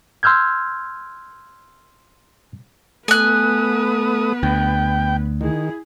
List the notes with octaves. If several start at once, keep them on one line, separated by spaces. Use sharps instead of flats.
C6 E6 F6 G6 G#6
A3 B3 B4 G#5 D#6 F#6
D2 G5
D#3 E4 G#4